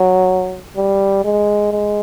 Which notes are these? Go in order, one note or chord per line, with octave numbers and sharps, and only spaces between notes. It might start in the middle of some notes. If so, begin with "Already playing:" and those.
Already playing: F#3
G3
G#3
G#3